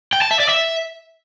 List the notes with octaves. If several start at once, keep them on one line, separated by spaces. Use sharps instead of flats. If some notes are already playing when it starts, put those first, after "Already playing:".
G5
A5
E5
D5
E5